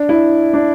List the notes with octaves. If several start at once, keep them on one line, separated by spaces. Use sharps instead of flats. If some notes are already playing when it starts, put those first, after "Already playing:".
Already playing: D4
E4
D4